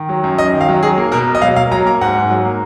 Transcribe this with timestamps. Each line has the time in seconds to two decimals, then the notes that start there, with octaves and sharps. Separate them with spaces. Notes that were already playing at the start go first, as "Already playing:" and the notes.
Already playing: D#3
0.09 F#3
0.24 F#2
0.38 F#2 D#5
0.53 D#3
0.61 F5
0.69 F#3
0.83 F#3 G#4
0.98 A#3
1.12 B2 A#4
1.27 B2
1.35 D#5
1.42 F#3 F5
1.56 A#3 F5
1.71 F#3 A#5
1.86 A#3 A#5
2.01 G#2 F#5
2.16 G#2
2.30 F#3
2.45 A#3